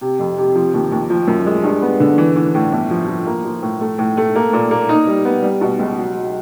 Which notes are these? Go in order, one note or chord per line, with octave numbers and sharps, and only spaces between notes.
C3
F2
C3
F3
D#2
D#2
F3
F#2
G#3
G2
B3
D3
E3
E3
A2
G1
F3
F3
A#3
F3
A2
A3
A2
A3
A#3
A#2
A#3
D#4
G3
B3
G3
B2
C#2
F#3
F#3